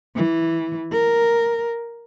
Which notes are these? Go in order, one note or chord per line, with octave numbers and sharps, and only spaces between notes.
E3
A#4